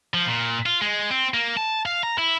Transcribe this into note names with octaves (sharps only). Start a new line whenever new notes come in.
F3
A#2
F4
G#3
C4
A#3
A5
F5
A#5
E4